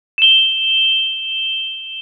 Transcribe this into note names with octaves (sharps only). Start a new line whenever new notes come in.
E7 G7